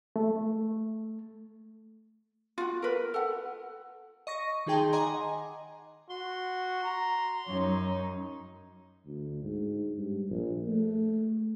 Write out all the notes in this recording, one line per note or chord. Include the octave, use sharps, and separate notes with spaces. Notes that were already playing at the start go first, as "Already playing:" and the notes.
A3
F4 F#4
A#4 B4
A4 F#5
D#5 C#6 A#6
D#3 D#4 G#4 G5 A5 C6
D#5 F#5 G#5 A#5 C6 D6
F#4 C6
A#5
F#2 D#4 C#5
D2
G#2
G2
A#1
A3